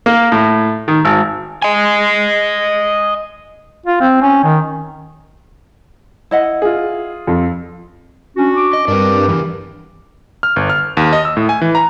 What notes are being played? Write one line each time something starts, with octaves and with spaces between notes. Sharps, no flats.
A#3
A2
D#3
G#1
D#5 G#5
F4
C4
C#4
D#3
E4 D#5 F#5
F4 G#4
F2
C#4 D4 F#4
D6
D#5
G2 C4 D4 A#4 B4
E2 C3 D#3 E3
F6
G1
F6
D#2
D#5
E6
A2
G#5
E3
A#5